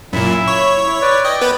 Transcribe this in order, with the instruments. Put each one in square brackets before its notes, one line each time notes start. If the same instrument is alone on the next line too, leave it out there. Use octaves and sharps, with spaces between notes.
[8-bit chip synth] F#2 A#2 [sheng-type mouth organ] E4 E5
[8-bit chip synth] C#5
[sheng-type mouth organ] E4
B4 D5
[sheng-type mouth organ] D5 G5 [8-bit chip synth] D#5
[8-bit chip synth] B3 B4